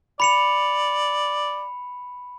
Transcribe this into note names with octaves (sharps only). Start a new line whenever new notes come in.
D5 B5 C#7 F7